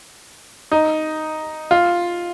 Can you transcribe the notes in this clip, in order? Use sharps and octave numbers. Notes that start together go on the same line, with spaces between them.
D#4
F4